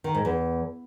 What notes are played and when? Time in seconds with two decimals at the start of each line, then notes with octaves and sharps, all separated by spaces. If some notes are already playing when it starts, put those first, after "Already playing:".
0.04 D#3
0.15 G#2
0.25 E2